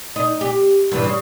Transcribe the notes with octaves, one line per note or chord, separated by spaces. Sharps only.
D#4
G4
G2 E3
C#3